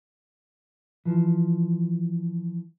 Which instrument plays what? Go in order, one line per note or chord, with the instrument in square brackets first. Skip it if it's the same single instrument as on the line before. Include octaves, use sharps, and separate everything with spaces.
[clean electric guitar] E3 F3